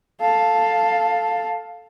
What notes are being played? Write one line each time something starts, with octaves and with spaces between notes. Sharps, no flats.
A4 F5